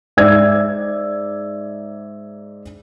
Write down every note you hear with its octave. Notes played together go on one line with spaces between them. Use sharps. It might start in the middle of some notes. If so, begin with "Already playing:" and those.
G#2 D5 E5 E6 G#6